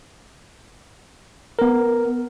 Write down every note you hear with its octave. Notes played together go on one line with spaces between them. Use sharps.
B3 A#4